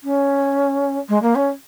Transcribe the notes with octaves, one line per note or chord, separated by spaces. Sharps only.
C#4
G#3
A#3
C#4